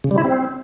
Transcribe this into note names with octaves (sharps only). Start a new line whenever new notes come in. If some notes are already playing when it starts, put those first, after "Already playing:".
C#3
G3
E4
C4